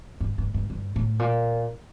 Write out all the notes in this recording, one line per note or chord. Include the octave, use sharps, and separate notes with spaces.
G2
G2
G2
G2
A2
A#2